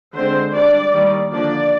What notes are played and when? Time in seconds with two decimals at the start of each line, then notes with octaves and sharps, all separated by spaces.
0.15 D3 G#3 C4 C5
0.54 G3 D4 D5
0.93 D#3 G3 A#3
1.31 D3 F3 A#3 D4 D5